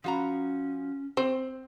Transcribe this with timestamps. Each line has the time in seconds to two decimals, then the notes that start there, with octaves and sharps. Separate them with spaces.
0.04 F3 C#4 F#4 A#5
1.17 C4 C5